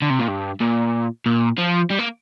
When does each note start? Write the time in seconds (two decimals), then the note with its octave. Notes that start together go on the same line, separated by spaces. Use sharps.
0.02 D3
0.10 C3
0.19 A#2
0.28 G2
0.61 A#2
1.26 A#2
1.58 F3
1.90 G3
1.99 A#3